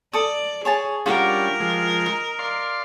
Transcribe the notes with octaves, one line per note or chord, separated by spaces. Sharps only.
A4 D5 D#6
G#4 C#5 G#5 A5
G3 C#4 D4 F4 G4 A#4 F#5
F3 G#3
D#4
D5 F5 C6